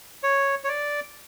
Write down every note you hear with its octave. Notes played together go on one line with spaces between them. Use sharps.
C#5
C#5
D5